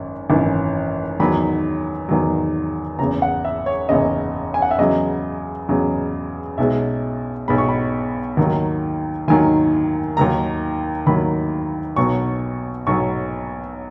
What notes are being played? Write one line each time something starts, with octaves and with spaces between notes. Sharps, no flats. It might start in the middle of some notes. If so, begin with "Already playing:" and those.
Already playing: G#1 F#2
G#1 F#2 E3
E2 D#3 F#3 B5
E2 D#3 F#3
F#1 E2 C#3 A#5
F#5
E5
C#5
F#1 E2 C#3 D#5
G#5
F#5
E5
E2 C#3 F#3 D#5
E2 C#3 F#3
B1 B2 G#3 E5
B1 B2 G#3 B5
C#6
B5
D#2 D#3 F#3
D#2 D#3 F#3 G#5
D#2 D#3 F#3 A#5
D#2 D#3 F#3 B5
B1 B2 F#3 C#6
B1 B2 F#3 C#6